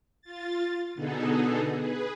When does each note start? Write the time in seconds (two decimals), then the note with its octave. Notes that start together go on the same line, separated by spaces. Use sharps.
0.22 F4 A6
0.95 B2 D3 B3 D#4 G#4 A4
1.77 G#4 B4